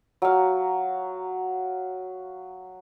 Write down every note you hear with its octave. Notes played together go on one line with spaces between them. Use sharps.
F#3 F5